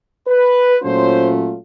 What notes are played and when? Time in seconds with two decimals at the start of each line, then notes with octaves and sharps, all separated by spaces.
0.27 B4
0.82 A#2 F#3 A3 C#4 F4 C5